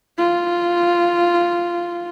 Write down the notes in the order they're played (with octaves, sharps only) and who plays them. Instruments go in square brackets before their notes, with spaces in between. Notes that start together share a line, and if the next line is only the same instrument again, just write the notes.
[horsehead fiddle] F4